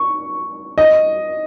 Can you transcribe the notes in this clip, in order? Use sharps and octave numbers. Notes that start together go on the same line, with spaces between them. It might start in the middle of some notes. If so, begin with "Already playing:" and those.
Already playing: C#6
D#5